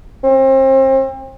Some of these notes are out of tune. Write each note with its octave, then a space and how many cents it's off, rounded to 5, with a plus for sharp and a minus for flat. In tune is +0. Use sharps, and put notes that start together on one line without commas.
C4 +35